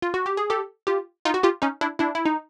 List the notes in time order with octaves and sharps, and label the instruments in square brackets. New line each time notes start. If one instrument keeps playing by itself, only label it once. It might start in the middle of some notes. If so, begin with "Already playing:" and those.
[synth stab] F4
F#4
G4
G#4
G4 A4
F4 G4
D#4 F4
F#4
F4 G4
C#4 D#4
D4 E4
D4 E4
E4
D#4